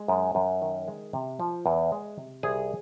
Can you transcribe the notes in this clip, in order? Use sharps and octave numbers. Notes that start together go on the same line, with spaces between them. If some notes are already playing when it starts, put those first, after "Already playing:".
Already playing: G#3
F#2
F#2
D#3
G#3
C3
F3
E2
G#3
C3
C2 G#4